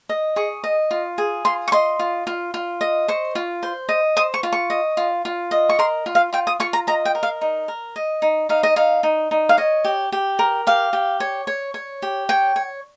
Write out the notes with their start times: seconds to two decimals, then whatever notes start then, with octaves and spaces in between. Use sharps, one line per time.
0.09 D#5
0.36 G#4 C#6
0.64 D#5
0.91 F4
1.18 G#4
1.45 F4 C6
1.68 C#6
1.72 D#5 C6
1.99 F4
2.27 F4
2.54 F4
2.81 D#5
3.08 C5 C#6
3.35 F4
3.63 C5
3.89 D#5
4.16 C5 D#6
4.34 C#6
4.43 F4
4.53 C#6
4.70 D#5
4.97 F4
5.25 F4
5.51 D#5
5.69 C#6
5.79 A#4 C6
6.06 F4
6.15 F5
6.33 F4 G5
6.47 D#6
6.60 F4 C#6
6.73 A#5
6.87 D#5 A#5
7.05 G5
7.15 A#4
7.23 F5
7.41 D#4
7.68 A#4
7.96 D#5
8.22 D#4
8.49 D#4 F5
8.63 D#5
8.76 D#4 F5
9.03 D#4
9.31 D#4
9.49 F5
9.57 C#5 D#5
9.85 G4
10.12 G4
10.39 A#4
10.67 G4 F5
10.93 G4
11.20 C#5
11.47 C#5
11.74 C#5
12.02 G4
12.29 C#5 G5
12.56 C#5